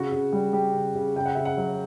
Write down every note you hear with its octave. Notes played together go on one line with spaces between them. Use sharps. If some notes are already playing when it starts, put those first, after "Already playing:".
Already playing: C#3 F#4
C#3
G3
G3 G4
C#3
C#3
C#3 G5
F#5
C#3 E5
F#5
F#3